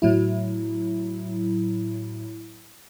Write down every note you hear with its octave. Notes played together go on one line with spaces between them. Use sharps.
A2 F#3 E4